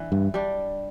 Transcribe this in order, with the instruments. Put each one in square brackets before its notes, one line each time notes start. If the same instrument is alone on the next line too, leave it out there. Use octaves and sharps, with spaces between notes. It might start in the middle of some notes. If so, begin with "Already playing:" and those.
Already playing: [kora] E3 D4
[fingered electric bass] G2
[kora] G3 D4